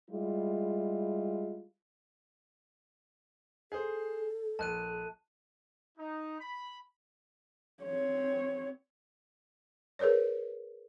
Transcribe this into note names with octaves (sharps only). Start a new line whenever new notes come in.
G3 G#3 E4 F4
G#4 A4 C5
A#1 A5 F#6 D#7
D#4
B5
C4 C#5
G#4 A#4 B4 C#5 D5